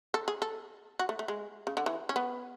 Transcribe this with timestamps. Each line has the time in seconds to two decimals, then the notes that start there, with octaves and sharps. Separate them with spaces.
0.14 A4
0.28 G#4
0.42 A4
0.99 F#4
1.09 A3
1.19 A3
1.28 G#3
1.67 C#3
1.77 D3
1.86 E3
2.09 C#4
2.16 B3